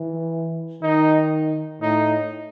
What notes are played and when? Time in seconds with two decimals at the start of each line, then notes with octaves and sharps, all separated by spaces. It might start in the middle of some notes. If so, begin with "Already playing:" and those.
Already playing: E3
0.82 D#3 D#4
1.81 A2 D#4